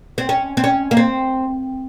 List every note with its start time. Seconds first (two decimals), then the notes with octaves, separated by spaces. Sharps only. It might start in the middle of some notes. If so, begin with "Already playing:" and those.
0.18 C4
0.29 C#4
0.57 C4
0.64 C#4
0.91 A#3
0.97 C4